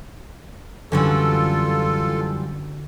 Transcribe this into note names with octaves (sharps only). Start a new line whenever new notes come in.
F#2 D3 E3 G3 F4 F#4 A4 E7